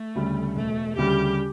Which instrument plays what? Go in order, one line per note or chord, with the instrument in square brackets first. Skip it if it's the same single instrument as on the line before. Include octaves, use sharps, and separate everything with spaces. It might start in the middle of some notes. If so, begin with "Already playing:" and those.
Already playing: [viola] A3
[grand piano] D2 C#3 G3
[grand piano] E1 [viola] A3
[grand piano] D2 C#3 G3 [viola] G4